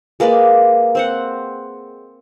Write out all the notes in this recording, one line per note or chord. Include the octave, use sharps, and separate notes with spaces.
G#3 A#3 B4 D5
C4 C5 F#5